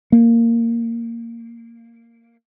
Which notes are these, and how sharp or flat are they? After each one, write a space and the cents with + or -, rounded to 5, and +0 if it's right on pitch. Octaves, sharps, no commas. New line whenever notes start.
A#3 -10